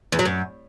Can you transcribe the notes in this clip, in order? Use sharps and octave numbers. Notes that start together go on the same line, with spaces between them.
E2
F#3
F#2